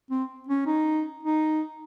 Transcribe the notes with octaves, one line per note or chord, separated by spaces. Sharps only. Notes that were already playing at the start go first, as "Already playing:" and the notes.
C4
C#4
D#4
D#4